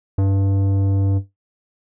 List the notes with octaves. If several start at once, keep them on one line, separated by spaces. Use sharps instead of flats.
G2